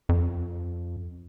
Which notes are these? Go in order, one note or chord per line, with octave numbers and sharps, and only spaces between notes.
F2